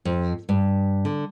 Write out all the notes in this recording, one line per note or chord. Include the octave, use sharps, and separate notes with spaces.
F2
G2
D3